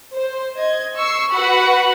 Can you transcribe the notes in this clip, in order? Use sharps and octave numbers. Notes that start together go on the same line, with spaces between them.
C5
D#5 G#6
C#6 E6 C7
F#4 B4 F#5 B5